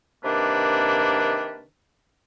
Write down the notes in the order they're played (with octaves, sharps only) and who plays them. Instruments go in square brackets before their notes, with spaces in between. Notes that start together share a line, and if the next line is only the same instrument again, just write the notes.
[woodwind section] C3 D#3 A#3 D4 B4